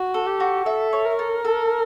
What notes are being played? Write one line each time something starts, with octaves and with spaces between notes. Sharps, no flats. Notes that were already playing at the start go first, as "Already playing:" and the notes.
Already playing: F#4
A4
G4
F#4
A4 E5
C#5
A#4
A4
A4